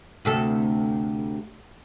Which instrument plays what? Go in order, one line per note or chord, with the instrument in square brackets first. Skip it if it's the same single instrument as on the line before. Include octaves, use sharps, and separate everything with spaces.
[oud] D2 C3 A4